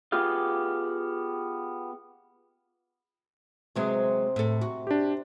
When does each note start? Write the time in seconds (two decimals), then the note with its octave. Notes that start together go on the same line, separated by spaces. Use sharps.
0.12 B3 F4 G4 G#4 F5
3.76 C3 F#3 G#3 B3
4.36 A2 A4
4.61 F#4
4.87 D4 G4